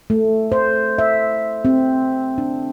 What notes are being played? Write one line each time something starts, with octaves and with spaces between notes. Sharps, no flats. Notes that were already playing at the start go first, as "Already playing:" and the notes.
A3
C5
E5
C4
D4